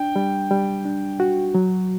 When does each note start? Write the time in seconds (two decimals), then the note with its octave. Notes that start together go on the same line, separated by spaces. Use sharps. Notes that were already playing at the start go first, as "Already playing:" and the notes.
Already playing: D4 G5
0.16 G3
0.51 G3
0.85 D4
1.20 F#4
1.54 F#3